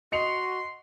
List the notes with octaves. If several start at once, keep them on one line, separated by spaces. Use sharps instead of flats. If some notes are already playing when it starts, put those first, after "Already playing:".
F#4 D#5 C6 C#7 F7